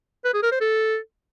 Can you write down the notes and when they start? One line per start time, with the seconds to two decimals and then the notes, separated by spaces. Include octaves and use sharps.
0.24 B4
0.33 G#4
0.43 A#4
0.52 C5
0.61 A4